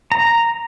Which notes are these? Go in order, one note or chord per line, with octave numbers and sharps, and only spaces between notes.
A#5